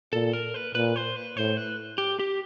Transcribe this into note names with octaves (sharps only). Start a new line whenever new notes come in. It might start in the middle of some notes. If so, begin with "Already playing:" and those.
A#2 A4
A#4
B4
A#2 B4
C5
B4
A2 C5
B4
G4
G4